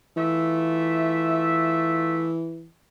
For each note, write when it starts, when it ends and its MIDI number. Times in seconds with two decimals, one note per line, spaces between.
0.17 2.68 52
0.17 2.31 57
0.17 2.31 65
0.17 2.31 76